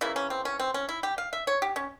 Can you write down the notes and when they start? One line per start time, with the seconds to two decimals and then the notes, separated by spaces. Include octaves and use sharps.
0.01 C#3 E3 A#3 E4
0.16 C#4
0.30 C4
0.45 C#4
0.59 C4
0.74 C#4
0.89 E4
1.03 G4
1.18 F5
1.33 E5
1.47 C#5
1.62 G4
1.76 C#4